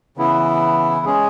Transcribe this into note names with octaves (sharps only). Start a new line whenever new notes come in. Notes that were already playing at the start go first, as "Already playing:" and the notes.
C#3 E3 B3 E4
G#3 C#4 G#4